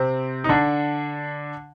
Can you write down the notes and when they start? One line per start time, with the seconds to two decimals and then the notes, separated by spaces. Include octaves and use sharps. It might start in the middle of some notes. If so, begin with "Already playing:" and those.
Already playing: C3 C4
0.44 D#4
0.49 D3 D4